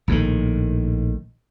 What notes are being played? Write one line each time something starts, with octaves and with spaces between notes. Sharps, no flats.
A#1 A2 D3 D#3